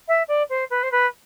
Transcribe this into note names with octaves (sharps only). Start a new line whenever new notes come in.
E5
D5
C5
B4
C5
B4